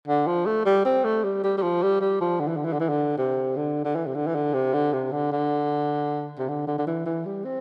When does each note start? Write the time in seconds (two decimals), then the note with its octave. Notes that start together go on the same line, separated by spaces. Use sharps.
0.08 D3
0.27 F3
0.46 A3
0.66 G3
0.86 C4
1.04 A3
1.24 G3
1.44 G3
1.58 G3
1.63 F3
1.83 G3
2.01 G3
2.21 F3
2.40 D3
2.48 E3
2.57 D3
2.65 E3
2.73 D3
2.80 E3
2.89 D3
3.18 C3
3.57 D3
3.85 D3
3.96 E3
4.07 C3
4.15 D3
4.27 E3
4.35 D3
4.54 C3
4.74 D3
4.93 C3
5.12 D3
5.32 D3
6.39 C3
6.48 D3
6.68 D3
6.79 D3
6.87 E3
7.06 E3
7.26 G3
7.45 C4